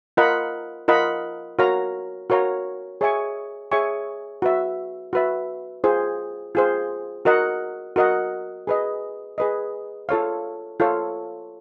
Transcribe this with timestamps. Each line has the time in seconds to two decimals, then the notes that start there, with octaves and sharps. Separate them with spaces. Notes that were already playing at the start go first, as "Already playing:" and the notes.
0.17 F4 A#4 D#5 F#5 B5
0.88 F4 A#4 D#5 F#5 B5
1.59 F#4 A#4 C#5 F5 A#5
2.30 F#4 A#4 C#5 F5 A#5
3.01 G#4 C#5 E5 G#5 C#6
3.72 G#4 C#5 E5 G#5 C#6
4.42 F#4 B4 E5
5.13 F#4 B4 E5
5.84 F4 G#4 C5
6.55 F4 G#4 C5
7.25 F#4 A#4 D#5 F#5
7.96 F#4 A#4 D#5 F#5
8.67 G#4 B4 D#5
9.38 G#4 B4 D#5
10.09 F4 A4 C#5 F5
10.80 F4 A4 C#5 F5